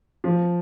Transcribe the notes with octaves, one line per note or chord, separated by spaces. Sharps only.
F3